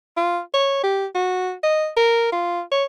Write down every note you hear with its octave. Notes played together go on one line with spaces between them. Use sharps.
F4
C#5
G4
F#4
D#5
A#4
F4
C#5